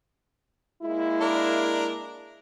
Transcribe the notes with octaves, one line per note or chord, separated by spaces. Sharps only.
G#3 A#3 E4
D4 A#4